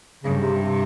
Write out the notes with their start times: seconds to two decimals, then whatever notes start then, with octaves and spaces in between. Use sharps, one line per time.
0.24 G2 C#3
0.41 C3
0.59 C3